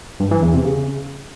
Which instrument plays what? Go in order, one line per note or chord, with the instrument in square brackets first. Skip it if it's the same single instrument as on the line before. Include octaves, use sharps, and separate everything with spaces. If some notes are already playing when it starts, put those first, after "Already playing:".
[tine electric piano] G2
E3
E2
C3
C#3